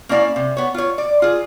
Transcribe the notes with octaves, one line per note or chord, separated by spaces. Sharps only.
A#3 C#4 E4 D5 F5
C3
B3 C#5
F4 C#5
D5
F4 G#4